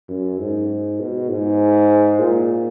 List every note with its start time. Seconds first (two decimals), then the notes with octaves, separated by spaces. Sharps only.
0.09 F#2
0.39 G#2
1.00 B2
1.30 G#2
2.20 A#2